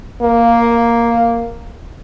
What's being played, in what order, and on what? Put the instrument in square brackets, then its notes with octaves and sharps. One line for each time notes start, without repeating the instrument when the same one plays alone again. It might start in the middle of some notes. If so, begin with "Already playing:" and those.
[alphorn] A#3